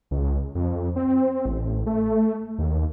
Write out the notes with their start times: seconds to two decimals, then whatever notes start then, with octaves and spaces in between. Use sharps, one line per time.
0.11 C#2
0.55 F2
0.96 C4
1.46 A1
1.86 A3
2.58 D#2